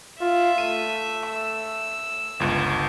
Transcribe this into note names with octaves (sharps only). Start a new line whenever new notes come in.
F4 E5
A3 D#7
E6
G1 C#2